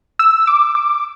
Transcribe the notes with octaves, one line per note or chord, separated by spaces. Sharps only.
E6
D6
D6